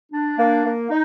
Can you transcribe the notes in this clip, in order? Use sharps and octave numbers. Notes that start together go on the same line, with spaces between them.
D4
A#3
A#3
D#4